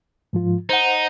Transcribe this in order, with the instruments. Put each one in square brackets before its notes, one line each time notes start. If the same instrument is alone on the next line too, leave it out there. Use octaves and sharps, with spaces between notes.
[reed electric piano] G#2 F3 F4
[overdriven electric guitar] D#4 [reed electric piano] C5 F#5